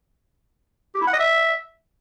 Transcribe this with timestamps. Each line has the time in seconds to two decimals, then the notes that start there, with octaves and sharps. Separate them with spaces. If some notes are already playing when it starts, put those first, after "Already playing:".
0.95 G4
1.01 E4
1.07 F#5
1.13 D#5
1.19 E5